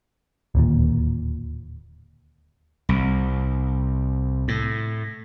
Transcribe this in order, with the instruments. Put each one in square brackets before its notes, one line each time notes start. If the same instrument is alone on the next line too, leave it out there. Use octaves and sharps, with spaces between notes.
[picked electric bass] D1 D#2 A#2
[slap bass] C2
A2